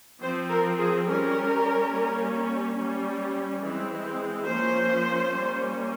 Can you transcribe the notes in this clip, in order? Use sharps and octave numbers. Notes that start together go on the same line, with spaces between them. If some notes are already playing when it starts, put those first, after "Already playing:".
F3 C4 C5
A#4
G#4
G3 C#4 A#4
G3 A#3 C#4
G3 C#4
E3 G#3 C4
F3 A#3 C#4 C5
G3 A#3 C#4